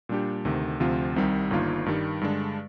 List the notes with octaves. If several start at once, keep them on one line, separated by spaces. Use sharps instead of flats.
A#2 G3 D4 G4
D2 C3 D#3
D2 C3 F3 C4 F4
C2 C3 D#3 G3
G1 G2 D#3 A#3 F4
G2 D#3 G3
G2 D3 G#3 D4